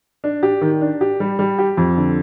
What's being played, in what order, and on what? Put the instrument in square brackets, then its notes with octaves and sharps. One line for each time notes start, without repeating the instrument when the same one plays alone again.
[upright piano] D4
G4
D#3
D4
G4
G3
G3
G4
F2
D3